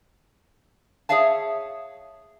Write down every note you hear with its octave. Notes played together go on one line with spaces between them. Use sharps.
G#4 C#5 E5 F5 A5